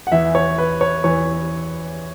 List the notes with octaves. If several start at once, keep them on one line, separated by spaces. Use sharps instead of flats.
F#5
E2 E3 E5
C#5
B4
C#5
E2 E3 C#5